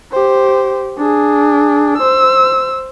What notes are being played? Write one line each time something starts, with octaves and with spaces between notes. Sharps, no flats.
G4 C5
D4 G#4
C5 E6